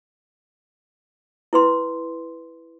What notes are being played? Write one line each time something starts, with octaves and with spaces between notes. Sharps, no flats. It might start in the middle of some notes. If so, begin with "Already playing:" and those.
E4 B4 C6